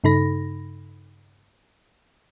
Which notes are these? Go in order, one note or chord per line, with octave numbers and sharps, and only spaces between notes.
G2 C#3 D#4 A4 B5 A#6